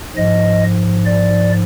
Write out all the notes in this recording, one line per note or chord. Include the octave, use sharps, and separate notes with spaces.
G#2 F3 D#5
D5